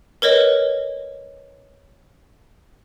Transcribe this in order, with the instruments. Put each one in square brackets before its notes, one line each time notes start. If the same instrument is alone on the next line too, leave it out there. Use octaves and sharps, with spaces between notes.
[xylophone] A#4 B4 C#5 D#5